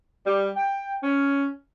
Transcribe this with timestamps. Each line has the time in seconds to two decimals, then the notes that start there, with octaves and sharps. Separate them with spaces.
0.25 G3
0.55 G5
1.02 C#4